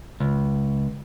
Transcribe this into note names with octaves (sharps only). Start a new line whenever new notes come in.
C#2